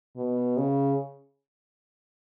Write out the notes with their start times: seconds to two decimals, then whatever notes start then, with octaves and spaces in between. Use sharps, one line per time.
0.17 B2
0.57 C#3